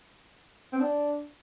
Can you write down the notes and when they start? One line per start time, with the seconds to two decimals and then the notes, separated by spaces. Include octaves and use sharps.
0.73 C4
0.80 D4